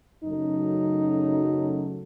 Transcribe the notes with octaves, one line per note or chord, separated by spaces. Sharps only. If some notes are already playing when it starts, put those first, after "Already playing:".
F#2 C#3 F#3 A3 D#4